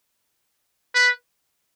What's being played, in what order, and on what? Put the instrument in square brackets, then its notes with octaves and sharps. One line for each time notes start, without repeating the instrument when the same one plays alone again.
[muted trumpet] B4